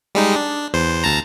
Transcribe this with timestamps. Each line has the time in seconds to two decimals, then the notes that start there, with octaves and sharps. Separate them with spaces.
0.15 G3 G#3 D#4
0.36 D4
0.74 E2 C5
1.04 D2 A5 A#5